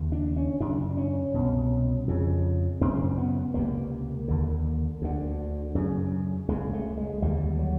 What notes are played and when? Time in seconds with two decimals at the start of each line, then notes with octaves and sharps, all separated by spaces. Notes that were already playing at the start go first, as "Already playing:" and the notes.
Already playing: D#2 C#3
0.12 D4
0.37 C#4
0.60 F#2 C#3 D4
0.97 C#4
1.34 C2 B2
2.08 F2 C#3
2.81 F#2 C#3 C4
3.18 B3
3.54 C#2 C3 A#3
4.28 D#2 D3
5.02 D2 D3
5.75 F#2 C#3
6.48 C#2 C#3 G#3
6.73 A3
6.97 G#3
7.22 D#2 D3 G3
7.59 F#3